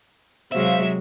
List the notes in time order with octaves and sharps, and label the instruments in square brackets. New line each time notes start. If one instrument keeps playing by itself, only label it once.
[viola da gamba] C3 F#3 G#3 [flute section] C5 F5 [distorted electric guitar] E5